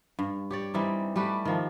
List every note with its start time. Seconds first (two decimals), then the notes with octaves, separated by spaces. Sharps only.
0.19 G2
0.51 G4 C#5 D5
0.74 E3 G3 C4 D#4
1.16 G3 A3 G4 B4
1.45 D#3 F3 A#3